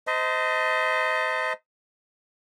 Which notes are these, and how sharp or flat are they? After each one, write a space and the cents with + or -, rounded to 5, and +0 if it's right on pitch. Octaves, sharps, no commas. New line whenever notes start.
C5 -30 D#5 +15 A5 +40